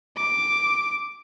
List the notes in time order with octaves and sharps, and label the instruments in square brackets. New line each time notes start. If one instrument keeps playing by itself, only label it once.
[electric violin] D6